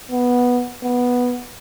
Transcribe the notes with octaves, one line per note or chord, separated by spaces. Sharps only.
B3
B3